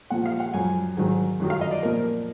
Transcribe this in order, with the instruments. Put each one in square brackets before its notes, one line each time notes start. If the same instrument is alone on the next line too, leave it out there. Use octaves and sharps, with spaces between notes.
[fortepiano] A#2 F3 F#5
F5
F#5
F#2 F3 G#5
G#2 D#3 F#3
F#2 D#3 F#3
F5
D#5
D5
A#2 F3 A#4